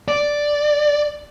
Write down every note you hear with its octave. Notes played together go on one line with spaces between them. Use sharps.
D5